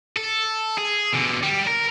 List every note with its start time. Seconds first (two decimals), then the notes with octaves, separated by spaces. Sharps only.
0.17 A4
0.78 G#4
1.13 B2 D3
1.43 G3
1.67 A#4